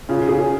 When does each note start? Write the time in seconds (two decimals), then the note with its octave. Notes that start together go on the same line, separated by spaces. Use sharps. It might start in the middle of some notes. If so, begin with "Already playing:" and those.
0.09 C#3 F4
0.29 C#3 G#4